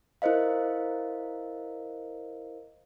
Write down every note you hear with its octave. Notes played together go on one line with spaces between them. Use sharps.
E4 A#4 C5 D#5 F5